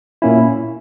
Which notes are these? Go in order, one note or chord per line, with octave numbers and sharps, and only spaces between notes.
A#2 A#3 C#4 E4